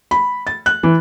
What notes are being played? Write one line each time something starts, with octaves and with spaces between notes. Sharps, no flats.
B5
A6
F#6
E3